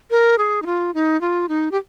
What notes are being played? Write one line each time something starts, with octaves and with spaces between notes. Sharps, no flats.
A#4
G#4
D#4
F4
D#4
F4
D#4
G4